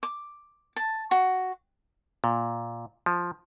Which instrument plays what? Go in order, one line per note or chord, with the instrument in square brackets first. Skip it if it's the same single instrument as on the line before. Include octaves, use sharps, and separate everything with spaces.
[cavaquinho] D6
A5
F#4
[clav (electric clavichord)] A#2
F3